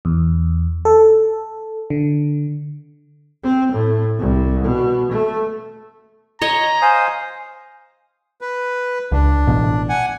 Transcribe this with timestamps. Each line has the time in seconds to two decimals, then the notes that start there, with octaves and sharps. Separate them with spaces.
0.05 E2
0.85 A4
1.90 D3
3.44 C4
3.72 A2
4.19 C2
4.63 B2
5.11 A3
6.42 C#5 D#5 A#5
6.82 C5 F5 G#5 D#6
8.41 B4
9.12 C#2 D4
9.47 A1 B2
9.89 F#5 G#5